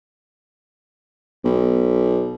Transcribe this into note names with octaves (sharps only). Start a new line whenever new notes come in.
B1